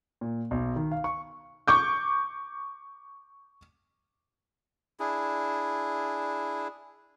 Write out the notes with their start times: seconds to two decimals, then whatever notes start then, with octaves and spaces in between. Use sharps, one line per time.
0.21 A#2
0.51 B1
0.76 D#3
0.91 F5
1.04 C#6
1.68 C#6 D6 G6
5.00 D4 E4 G#4